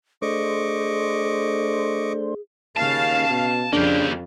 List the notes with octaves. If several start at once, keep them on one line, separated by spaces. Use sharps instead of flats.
A3 D4 G#4 C5 D#5 C#6 D6
D#2 C#3 F5 A5
B2
F2 C#3 A#3 D4 G4